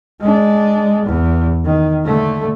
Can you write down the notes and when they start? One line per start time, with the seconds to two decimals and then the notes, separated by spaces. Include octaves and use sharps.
0.21 G#3 D4
1.05 E2
1.65 D#3
2.04 D3 A3